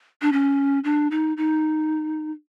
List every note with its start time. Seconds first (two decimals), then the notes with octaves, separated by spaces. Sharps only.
0.22 D4
0.32 C#4
0.84 D4
1.11 D#4
1.37 D#4